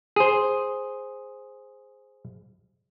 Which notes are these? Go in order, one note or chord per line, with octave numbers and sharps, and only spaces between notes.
G#4 C5